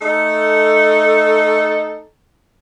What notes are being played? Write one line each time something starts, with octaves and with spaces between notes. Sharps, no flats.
A3 D#4 A4